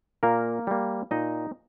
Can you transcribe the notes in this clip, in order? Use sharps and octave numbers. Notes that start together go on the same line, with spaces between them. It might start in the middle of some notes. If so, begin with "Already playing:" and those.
A#2 A#3 A#4
G3 A#3
A#2 D#4 D#5